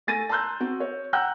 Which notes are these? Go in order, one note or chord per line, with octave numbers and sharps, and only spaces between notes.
A3 A4 G#5 A6 A#6 D#7
A5 A#5 C6 E6 F#6 G6
C4 F#4
C#5
F#5 G5 A#5 E6 F#6 G6